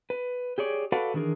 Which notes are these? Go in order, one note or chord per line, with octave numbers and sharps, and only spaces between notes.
B4
G4 G#4 C#5 D5
F#4 A4 B4 D5 F5 F#5
D#3 E3 D4 G#4 A#4